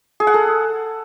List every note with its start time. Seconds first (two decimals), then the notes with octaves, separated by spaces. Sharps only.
0.20 G#4
0.27 F#5
0.34 A4